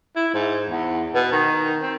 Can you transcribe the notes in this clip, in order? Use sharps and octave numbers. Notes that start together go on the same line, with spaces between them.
E4
G#2
E2
B2
D#3
C4